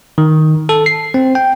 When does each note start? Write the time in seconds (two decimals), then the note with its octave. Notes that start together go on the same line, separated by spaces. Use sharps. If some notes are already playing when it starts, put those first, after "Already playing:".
0.18 D#3
0.69 A4
0.86 C7
1.14 C4
1.35 G5